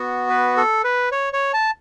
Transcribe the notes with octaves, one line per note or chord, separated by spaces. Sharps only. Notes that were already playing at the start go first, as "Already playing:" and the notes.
Already playing: B3 F#4
B4
A4
B4
C#5
C#5
A5